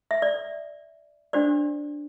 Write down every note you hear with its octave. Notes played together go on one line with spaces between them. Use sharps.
E5
D5
D4 F#4 C5 D5